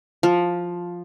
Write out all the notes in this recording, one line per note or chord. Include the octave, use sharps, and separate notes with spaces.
F3